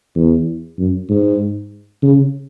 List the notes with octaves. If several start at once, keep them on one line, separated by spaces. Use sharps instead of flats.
E2
F#2
G#2
C#3